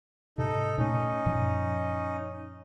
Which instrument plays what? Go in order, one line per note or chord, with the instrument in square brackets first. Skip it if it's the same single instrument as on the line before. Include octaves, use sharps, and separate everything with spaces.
[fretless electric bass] G#2 C3 [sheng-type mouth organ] D#4 A4
[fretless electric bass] A#2 A3 [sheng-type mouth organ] C#4 D#4
[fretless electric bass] F#2 A#2 F3